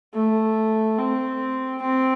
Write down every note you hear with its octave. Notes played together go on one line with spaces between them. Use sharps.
A3
C4
C4